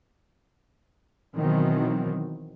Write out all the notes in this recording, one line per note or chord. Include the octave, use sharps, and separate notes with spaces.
B2 D#3 E3 F#3 C4